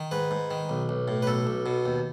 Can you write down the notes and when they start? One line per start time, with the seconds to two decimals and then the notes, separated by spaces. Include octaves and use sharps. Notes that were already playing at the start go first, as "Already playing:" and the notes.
Already playing: D#3
0.11 G#2 B4
0.31 G#2
0.51 D#3
0.69 B1
0.89 B1
1.08 A2
1.22 B4
1.27 B1 A4
1.47 B1
1.66 B2
1.85 D#2